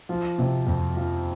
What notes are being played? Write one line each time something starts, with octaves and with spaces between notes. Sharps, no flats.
F3
C3
F2
F3